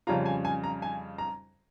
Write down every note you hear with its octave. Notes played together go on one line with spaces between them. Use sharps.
F2 C#3 G3 C#4 F4 A#5
G#5
G#5
A#5
G#5
A#5